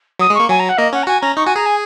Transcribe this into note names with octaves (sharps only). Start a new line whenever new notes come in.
F#3 D#6
G#3
A#3 C#6
F#3 G#5
A#5
F#5
A#3 D#5
C#4 F#5
A#5
F#4 G#5
C#4 A#5
D#4 C#6
F#4 G#5
G#4 A#5
G#5